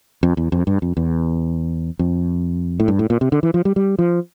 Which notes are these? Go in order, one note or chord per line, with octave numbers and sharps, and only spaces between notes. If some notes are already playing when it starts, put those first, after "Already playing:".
F2
E2
F2
G2
F2
E2
F2
A2
G2
A2
A#2
C3
D3
E3
F3
G3
G3
F3